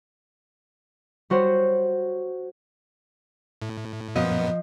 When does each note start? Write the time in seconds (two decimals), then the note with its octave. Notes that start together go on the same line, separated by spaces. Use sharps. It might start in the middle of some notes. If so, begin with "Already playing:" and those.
1.30 G3 F#4 C5 C#5
3.62 A2
4.15 F#2 A#2 F3 B3 D#5